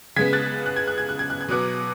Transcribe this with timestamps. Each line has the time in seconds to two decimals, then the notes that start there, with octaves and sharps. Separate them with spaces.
0.16 C#3 G#3 B3 G#6 B6
0.33 F#6 A6
0.66 F#6
0.76 G#6
0.88 F#6
0.98 G#6
1.09 F#6
1.19 G#6
1.30 F#6
1.41 G#6
1.48 B2 F#3 B3 D6 F#6